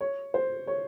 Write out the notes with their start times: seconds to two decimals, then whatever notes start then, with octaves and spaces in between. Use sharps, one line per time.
0.01 C#5
0.34 C5
0.67 C#5